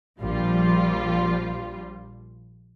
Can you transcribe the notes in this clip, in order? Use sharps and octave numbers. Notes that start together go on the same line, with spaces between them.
A#1 F3 G3 F4